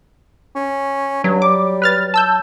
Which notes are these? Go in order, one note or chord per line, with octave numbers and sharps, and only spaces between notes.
C#4
G2 F#3
G3 D6
B4 F6 A6
A5 E6 G6